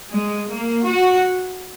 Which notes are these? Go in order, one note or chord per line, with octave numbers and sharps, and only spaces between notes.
G#3
A#3
F#4